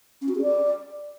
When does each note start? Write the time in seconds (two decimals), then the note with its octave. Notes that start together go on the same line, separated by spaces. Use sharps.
0.22 C#4
0.28 F#4
0.35 G#4
0.42 D5